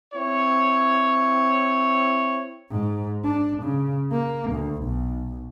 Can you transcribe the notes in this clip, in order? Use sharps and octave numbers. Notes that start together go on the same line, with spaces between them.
C4 E4 C#5
G#2
D4
C#3
A#3
D2
B1